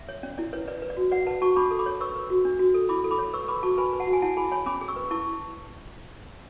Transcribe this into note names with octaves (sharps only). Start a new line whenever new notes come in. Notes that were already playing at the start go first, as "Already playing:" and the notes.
Already playing: E5
C#5
C#4 D5
E4 D5
B4 C#5
B4 D5
B4
D5
F#4
B4 D5 F#5
B4 F#5 A5
F#4 A5 C#6
D4 B5 D6
A4
B5 D6
C#5
B4 C#6 E6
B4
F#4
D4
F#4
A4
E4 B5 D6
A4
B5 D6
C#5
B4 C#6 E6
B4 B5 D6
F#4 A5 C#6
B4 G#5 B5
B4
F#5 A5
F#4
G#5
E4 F#5 A5
G#4 G#5 B5
C#5 G#5 B5
C#4 B5 D6
G#4
C#6 E6
B4
E4 A5 C#6